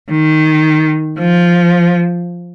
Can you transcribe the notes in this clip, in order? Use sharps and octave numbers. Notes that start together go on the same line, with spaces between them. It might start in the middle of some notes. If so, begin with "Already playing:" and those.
D#3
F3